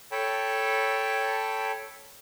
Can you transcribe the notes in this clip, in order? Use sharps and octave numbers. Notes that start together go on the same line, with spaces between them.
A4 C#5 G5 A5 B5